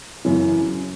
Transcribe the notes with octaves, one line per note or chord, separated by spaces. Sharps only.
F#2 C#3 E3